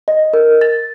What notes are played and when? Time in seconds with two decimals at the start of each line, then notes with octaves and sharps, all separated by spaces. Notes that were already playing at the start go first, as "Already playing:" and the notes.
0.08 D#5
0.34 A#4
0.61 A6